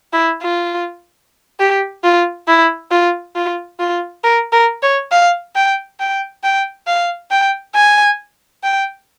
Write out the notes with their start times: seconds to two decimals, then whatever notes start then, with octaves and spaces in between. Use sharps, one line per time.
0.13 E4
0.42 F4
1.60 G4
2.03 F4
2.48 E4
2.91 F4
3.35 F4
3.79 F4
4.24 A#4
4.53 A#4
4.82 C#5
5.11 F5
5.55 G5
6.00 G5
6.43 G5
6.87 F5
7.31 G5
7.75 G#5
8.63 G5